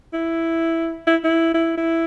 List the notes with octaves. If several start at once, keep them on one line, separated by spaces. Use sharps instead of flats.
E4
E4
E4
E4
E4